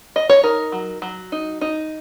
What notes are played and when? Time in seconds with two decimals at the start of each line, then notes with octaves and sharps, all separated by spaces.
0.16 D#5
0.29 C#5
0.43 D#4 A#4
0.72 F#3
1.02 F#3
1.32 D#4
1.61 D#4